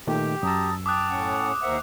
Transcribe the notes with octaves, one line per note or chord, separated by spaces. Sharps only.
A#2 D#3 A3 G4 G5
F#2 A5 A#5 D#6 E6
G5 A5 D6 D#6 F#6
A2 C#4 F#5
D#2 A#4 C5 E5 F#5